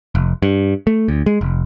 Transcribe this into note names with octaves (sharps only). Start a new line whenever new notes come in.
F1
G2
A3
D2
G#3
F1